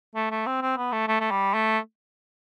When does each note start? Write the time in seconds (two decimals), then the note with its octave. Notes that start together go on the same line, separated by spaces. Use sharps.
0.15 A3
0.31 A3
0.46 C4
0.62 C4
0.77 B3
0.92 A3
1.08 A3
1.20 A3
1.31 G3
1.54 A3